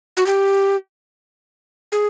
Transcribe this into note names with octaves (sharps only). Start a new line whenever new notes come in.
F#4
G4
G#4